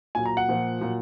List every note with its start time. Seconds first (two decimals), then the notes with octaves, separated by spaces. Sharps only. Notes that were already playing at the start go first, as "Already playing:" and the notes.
0.15 A#2 F#3 G#5
0.26 A#5
0.37 F#5
0.49 A#2 F3
0.81 A#2 F#3